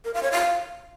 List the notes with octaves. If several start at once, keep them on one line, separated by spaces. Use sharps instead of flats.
A#4
F5
C#5
F5